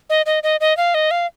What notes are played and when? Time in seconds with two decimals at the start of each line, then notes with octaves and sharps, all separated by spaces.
0.10 D#5
0.26 D#5
0.43 D#5
0.60 D#5
0.77 F5
0.94 D#5
1.11 F5